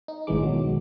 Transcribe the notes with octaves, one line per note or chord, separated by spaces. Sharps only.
D#4
G#1 A2 C#3 E3 G#3 D6
B1 D#3 F#3